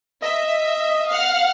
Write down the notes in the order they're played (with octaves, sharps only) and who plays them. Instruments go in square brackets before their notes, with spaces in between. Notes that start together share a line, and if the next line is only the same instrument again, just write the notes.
[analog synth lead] D#5 [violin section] E5
[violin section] F5 F#5 F6